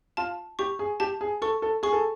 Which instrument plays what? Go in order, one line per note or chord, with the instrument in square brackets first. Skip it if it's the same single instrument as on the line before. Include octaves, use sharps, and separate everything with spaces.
[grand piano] F4 [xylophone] A5
[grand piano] G4 [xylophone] C#6
[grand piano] G#4
[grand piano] G4 [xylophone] A5
[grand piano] G#4
[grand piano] A4 [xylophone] C#6
[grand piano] A4
[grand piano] G#4 [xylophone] C#6
[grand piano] A4